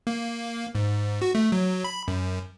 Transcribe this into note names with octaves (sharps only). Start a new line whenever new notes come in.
A#3
G#2
F#4
A3
F#3
B5
F#2